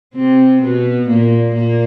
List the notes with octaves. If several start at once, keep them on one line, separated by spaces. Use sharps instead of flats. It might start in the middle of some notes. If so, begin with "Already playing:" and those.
C3 C4
B2 B3
A#2 A#3
A#2 A#3